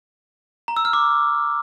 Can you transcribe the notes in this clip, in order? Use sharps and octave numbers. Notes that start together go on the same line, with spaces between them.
A#5
E6
F6
D6